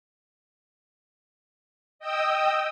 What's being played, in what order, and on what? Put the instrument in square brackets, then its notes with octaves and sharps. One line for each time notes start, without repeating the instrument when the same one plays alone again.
[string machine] D#5 G5 D#6 E6